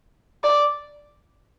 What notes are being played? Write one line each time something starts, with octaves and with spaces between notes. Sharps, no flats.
D5